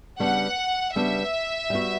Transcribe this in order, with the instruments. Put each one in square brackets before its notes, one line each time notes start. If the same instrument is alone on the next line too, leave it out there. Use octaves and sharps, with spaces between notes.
[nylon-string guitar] C#3 G3 B3 D4 [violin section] F#5
[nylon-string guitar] C#3 G3 B3 D4 [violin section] E5
[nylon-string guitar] G3 B3 F#4